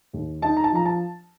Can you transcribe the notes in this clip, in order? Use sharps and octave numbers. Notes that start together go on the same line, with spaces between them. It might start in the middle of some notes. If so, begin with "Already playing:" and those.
D#2
D#4 A5
A#5
A5
F3 A#5
A5